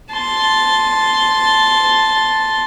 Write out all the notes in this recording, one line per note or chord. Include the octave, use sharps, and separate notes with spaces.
A5 C6